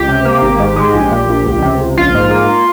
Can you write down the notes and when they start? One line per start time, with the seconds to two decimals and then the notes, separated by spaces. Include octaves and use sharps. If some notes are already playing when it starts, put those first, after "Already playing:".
Already playing: C#2 G4
0.08 C3
0.25 A#3
0.42 G#1
0.60 G#2
0.76 G#3
0.94 A#1
1.11 A#2
1.28 A#1
1.45 C#2
1.62 C3
1.81 C#2
1.97 A#1 F4
2.14 G#2
2.31 A#3